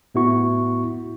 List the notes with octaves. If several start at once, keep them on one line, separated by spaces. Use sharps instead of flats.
A2 B3 E4 F#4 C#6